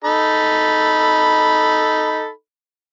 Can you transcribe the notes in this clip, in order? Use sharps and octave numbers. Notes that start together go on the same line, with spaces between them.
D#4 A4 B5